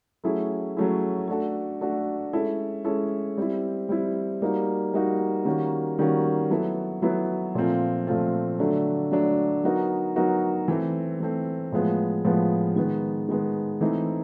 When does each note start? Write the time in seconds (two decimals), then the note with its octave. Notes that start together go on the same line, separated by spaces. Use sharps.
0.24 F#3 A3 C#4 E4 G#4
0.77 F#3 A3 C#4 E4 G#4
1.28 A3 D4 F#4 A4
1.81 A3 D4 F#4 A4
2.33 G#3 C#4 E4 A4
2.84 G#3 C#4 E4 A4
3.37 G3 C4 E4
3.89 G3 C4 E4
4.42 G3 A#3 D#4 F#4
4.94 G3 A#3 D#4 F#4
5.45 D#3 G3 A#3 C#4 F#4
5.99 D#3 G3 A#3 C#4 F#4
6.50 F#3 B3 E4 A4
7.02 F#3 B3 E4 A4
7.55 A#2 F3 A3 C4 F4
8.07 A#2 F3 A3 C4 F4
8.59 D3 F#3 A3 D4
9.11 D3 F#3 A3 D4
9.64 F#3 B3 D#4 F#4 A#4
10.16 F#3 B3 D#4 F#4 A#4
10.68 E3 A3 C4
11.20 E3 A3 C4
11.72 A2 F3 G#3 B3
12.25 A2 F3 G#3 B3
12.76 D#3 G#3 B3
13.28 D#3 G#3 B3
13.81 E3 A3 C4 D#4